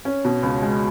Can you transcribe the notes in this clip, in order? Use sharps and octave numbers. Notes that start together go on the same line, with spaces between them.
C#4
B2
C#2
G#3